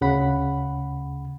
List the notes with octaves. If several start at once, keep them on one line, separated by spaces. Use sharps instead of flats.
D2 C#3 F#5 B5